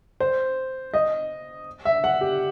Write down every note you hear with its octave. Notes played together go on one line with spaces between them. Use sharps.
C5
D#5
E5
F#5
G4